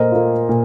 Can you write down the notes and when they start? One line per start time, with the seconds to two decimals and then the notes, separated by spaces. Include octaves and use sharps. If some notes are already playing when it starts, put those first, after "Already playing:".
Already playing: A#2 A#4 C5 D#5
0.12 A#3 F4
0.49 A#2